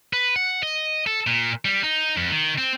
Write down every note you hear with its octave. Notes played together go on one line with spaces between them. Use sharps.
B4
F#5
D#5
A4
A#2
G3
D#4
F2
D#3
C4